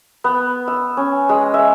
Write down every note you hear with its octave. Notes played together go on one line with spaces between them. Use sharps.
B3
E6
C#4
G#3
E5